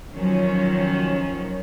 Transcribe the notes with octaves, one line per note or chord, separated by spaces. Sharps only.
D#3 F3 F#3 C#4